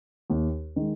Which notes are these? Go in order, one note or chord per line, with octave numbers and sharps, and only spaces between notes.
D#2
D#3 G#3